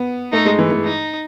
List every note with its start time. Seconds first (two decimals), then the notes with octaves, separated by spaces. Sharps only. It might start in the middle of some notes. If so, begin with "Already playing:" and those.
Already playing: B3
0.32 A3 D#4
0.45 G#3
0.59 E3
0.71 E3
0.84 D#4